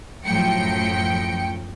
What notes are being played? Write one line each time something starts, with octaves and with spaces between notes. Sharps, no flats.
F#2 A2 F3 F#3 G5 C#7